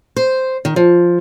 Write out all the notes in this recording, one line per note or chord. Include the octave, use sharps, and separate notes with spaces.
C5
D#3
F3